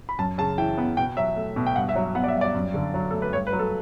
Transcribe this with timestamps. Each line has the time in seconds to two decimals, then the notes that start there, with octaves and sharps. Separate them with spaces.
0.09 B5
0.19 F#2 A5
0.38 C#3 A5
0.58 E3 G5
0.78 B3
0.97 B2 G5
1.17 F#3 E5
1.36 A3
1.56 B2
1.66 G5
1.76 G2 F#5
1.89 E5
1.96 F#3
2.02 E5
2.15 B3 F#5
2.24 D5
2.28 E5
2.34 G2
2.41 D5
2.54 F#2
2.74 D3
2.94 F#3
3.11 A3 A4
3.22 B4
3.33 G2 C#5
3.47 B4
3.53 F#3
3.59 A4